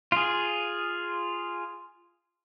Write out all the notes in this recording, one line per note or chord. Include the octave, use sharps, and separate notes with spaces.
F4 G#4